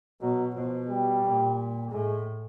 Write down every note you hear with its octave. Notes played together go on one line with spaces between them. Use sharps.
B2 F#3
B2 F3
G3
A#2
A2 G#3